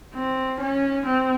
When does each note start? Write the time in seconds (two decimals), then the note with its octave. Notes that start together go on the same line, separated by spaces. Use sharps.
0.15 C4
0.60 C#4
1.06 C4